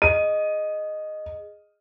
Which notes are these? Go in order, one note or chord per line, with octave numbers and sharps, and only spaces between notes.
G#4 D#5 D#7